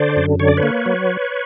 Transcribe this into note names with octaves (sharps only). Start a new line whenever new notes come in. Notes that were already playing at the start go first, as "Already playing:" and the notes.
Already playing: D3 C5 D5
F#2
D3 C#5
D5
B4 C#5
A#3
F#3